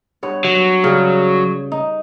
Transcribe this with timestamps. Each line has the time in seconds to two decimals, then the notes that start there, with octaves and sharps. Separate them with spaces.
0.23 G2 B3 C#5
0.44 F#3
0.84 C#3 G3
1.72 D#4